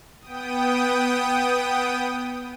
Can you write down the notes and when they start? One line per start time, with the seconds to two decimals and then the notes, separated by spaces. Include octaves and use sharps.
0.22 B3 G5 D#6